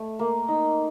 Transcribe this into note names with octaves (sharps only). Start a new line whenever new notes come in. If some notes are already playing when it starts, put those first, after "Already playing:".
Already playing: A3
A#3
D#4